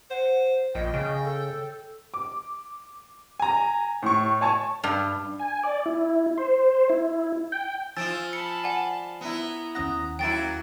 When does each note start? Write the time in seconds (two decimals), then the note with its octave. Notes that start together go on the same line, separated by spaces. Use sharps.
0.11 C5 F#5
0.75 A#1 D#5 G5
0.94 C#3
1.24 A4
2.14 D6
3.40 G#5 A#5
4.02 A2 C#6
4.41 C#5 G#5 A5 C#6
4.84 G2
5.39 G#5
5.63 D5
5.86 E4
6.38 C5
6.90 E4
7.52 G5
7.97 F3 F4 G#5 D#6 E6 A6 D7 E7
8.33 A5 B5 C#7
8.64 D5 F#5 G#5
9.21 B3 E4 A#5
9.75 D#2 C#4 F#5 D#6 F#6 A#6
10.19 F#3 A#3 E4 G5 A6 D7